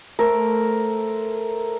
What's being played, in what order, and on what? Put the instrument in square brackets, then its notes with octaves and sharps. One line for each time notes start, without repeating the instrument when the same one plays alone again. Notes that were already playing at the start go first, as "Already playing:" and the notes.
[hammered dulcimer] A3 A4 C5 [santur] A#4